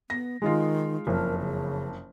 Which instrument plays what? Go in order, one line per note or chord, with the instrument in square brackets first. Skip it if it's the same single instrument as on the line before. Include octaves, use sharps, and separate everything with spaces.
[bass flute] B3 [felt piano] A#6
[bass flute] D#3 [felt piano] G#3 D#4 F4
[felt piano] F#1 F2 [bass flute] A#4
[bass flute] C#3